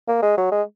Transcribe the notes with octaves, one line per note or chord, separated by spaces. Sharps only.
A#3
G#3
F#3
G#3